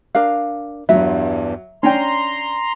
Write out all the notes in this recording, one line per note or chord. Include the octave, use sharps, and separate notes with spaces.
D4 A#4 F5
E2 G2 F#3 E5
C#4 D4 G5 A#5 C6